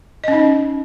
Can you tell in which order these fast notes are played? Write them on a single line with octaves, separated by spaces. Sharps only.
D#5 C#4 D#4